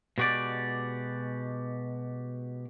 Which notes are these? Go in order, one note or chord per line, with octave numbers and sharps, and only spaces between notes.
B2 G#3 F#4 G4 D5